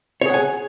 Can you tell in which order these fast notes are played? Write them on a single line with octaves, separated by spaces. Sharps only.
C#5 G#4 F#5 G#5